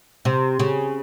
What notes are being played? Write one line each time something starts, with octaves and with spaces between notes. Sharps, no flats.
C3
C#3